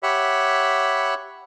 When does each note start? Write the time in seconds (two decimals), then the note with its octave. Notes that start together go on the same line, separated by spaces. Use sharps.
0.03 G4 C#5 E5 F#5 B5